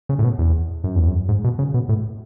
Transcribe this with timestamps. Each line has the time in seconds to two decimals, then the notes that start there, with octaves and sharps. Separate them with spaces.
0.09 C#3
0.19 A2
0.24 B2
0.39 E2
0.84 F#2
0.96 E2
1.08 F#2
1.29 G#2
1.44 B2
1.59 C#3
1.74 B2
1.89 A2